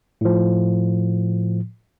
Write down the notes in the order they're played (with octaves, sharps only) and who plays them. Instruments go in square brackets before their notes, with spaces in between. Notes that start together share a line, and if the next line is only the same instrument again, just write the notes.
[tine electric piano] A2 F3